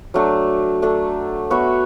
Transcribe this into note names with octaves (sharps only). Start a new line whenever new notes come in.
F#3 A3 D4
A3 D4 A4
B3 F#4 C#5 E5